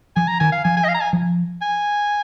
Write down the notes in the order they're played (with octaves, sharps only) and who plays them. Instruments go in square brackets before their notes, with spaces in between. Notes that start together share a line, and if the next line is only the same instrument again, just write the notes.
[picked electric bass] F3 [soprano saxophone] G#5
[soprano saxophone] A#5
[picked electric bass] D#3 [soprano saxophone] G#5
[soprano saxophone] F5
[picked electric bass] F3 [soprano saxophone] G#5
[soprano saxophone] G#5
D#5
F5
A#5
G#5
[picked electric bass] F3
[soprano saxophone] G#5